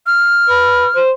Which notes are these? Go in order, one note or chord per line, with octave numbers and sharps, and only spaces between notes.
F6
B4
C5